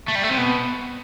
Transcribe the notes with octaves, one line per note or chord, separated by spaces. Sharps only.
A3
G3
A3
C3
B2